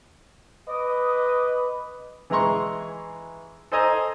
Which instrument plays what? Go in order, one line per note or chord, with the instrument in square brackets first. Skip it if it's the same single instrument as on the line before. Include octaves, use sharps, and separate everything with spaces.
[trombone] B4 [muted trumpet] D#5 [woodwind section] D6 D#6
[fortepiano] E3 G#3 E4 A#5 C6 C#6
A4 C5 D#5 G#5 A#5